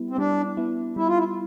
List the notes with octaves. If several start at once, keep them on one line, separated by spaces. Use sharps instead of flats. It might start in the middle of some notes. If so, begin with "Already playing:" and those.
Already playing: G3 B3 E4
C4
G3 D4
B3 E4
G3 E4
F4
E4